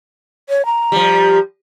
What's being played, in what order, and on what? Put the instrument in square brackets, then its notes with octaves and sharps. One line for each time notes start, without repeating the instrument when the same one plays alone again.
[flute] C#5
A#5
[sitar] F3 G3